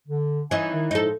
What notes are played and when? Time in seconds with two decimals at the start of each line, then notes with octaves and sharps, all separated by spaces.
0.07 D3
0.51 E3 C#4 D#4 E5 G#5
0.73 D#3
0.91 A2 F3 G#3 D#4 A4